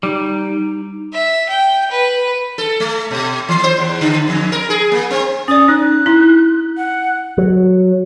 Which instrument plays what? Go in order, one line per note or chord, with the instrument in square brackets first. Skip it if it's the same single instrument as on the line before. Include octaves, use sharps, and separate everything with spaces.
[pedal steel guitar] G3 [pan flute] D#4
[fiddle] E5
G5
B4
[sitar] A4
A3
B2
E3
C5
E2
D3
F2
A#4
G#4
A#3
C4
[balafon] C#4 D5 [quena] D#6
[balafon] D#4 [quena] F#6
[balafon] E4 C6
[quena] F#5
[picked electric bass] F#3